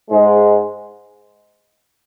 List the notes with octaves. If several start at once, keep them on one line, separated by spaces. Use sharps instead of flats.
G#2 G#3